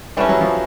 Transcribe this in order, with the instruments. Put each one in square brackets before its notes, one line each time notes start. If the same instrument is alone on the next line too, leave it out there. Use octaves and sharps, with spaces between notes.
[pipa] E3 A3 C#4 [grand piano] G3
[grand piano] F#3
F3